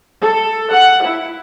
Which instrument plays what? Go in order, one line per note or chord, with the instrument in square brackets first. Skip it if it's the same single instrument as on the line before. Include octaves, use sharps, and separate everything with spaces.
[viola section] A4
F#5
E4